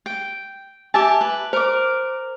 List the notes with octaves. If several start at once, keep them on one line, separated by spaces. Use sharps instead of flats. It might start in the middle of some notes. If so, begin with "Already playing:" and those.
G5
G4 E5 G#5 A5
B4
A#4 C5 D6